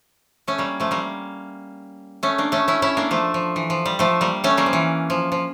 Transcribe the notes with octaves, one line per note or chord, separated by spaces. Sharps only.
A3 C#4
G3 A#3
F3 A3
G3 A#3
A3 C#4
A#3 D4
A3 C#4
C#4 E4
C#4 E4
A#3 D4
F3 A3
F3
E3
F3
G3
F3 A3
G3 A#3
A3 C#4
G3 A#3
F3
E3
F3
F3